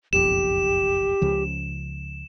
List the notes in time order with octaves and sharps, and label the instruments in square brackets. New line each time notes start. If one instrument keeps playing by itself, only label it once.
[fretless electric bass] F#1 B1 F2 [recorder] G4 [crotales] E7
[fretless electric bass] C#2 C#3 F3